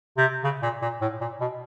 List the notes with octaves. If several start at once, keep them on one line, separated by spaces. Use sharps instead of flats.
C3
C#3
A#2
A#2
A2
A#2
B2